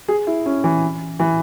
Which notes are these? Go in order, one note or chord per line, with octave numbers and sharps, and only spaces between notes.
G#4
E4
C#4
E3
E3